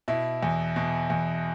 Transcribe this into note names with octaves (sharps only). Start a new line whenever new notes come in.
B2 E4
E2
B2
E2